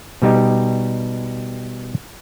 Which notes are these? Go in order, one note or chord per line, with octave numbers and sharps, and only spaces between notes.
B2 G3 D#4 G4